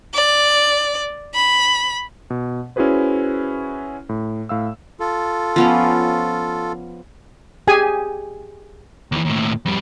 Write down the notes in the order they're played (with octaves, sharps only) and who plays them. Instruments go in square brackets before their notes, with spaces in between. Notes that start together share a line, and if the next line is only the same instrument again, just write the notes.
[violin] D5
B5
[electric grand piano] B2
C#4 E4 F#4 G#4 B4 C5
A2
A2 F5 E6
[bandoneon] F4 A4
[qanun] F3 B3 C#4
[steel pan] G4 G#4 G#5
[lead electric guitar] D#2 E3
D#2 A2
F2 G3